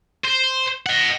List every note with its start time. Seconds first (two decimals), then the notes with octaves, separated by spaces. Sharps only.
0.25 C5
0.86 D#5 F#5